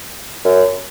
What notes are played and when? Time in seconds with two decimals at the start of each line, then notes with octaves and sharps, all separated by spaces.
0.45 F#2